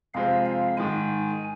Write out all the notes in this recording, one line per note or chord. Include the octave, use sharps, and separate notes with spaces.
F2 C3 G#3 F4 C5 F5
F5
G#2 D#3 G#3 G#5